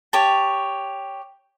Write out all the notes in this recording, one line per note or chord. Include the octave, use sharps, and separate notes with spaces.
G4 C#5 A5